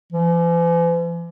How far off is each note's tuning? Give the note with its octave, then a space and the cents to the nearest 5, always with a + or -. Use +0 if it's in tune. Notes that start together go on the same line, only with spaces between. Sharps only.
E3 +45